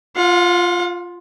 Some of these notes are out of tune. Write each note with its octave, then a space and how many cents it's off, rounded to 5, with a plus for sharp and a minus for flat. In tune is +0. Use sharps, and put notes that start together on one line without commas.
F4 +0 F#5 -45